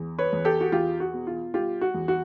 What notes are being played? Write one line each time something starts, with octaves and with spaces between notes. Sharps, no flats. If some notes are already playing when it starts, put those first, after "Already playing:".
Already playing: E2
B4 C#5
E2
G4 A4
F#4
E2 F4 G4
F#4
B2
F4
G3 F4 G4
F#4
E2
F#4